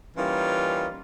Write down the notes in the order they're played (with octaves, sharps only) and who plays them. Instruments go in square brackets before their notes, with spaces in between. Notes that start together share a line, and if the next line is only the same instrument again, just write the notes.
[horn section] E3 G3 A#3 C#4 D#4 F4